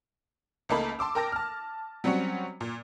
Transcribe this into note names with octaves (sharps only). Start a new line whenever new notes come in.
C#2 A3 A#3 D#4 A5 B5
A5 C6 D6 E6
A#4 G5 A5 A#6
A5 F6
F#3 G3 C4 C#4 F#4
A#2